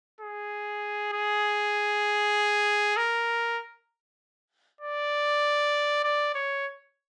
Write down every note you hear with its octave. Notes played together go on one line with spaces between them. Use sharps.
G#4
G#4
A#4
D5
D5
C#5